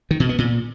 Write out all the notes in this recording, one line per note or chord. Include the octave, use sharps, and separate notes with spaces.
D#3
B2
B3
A#2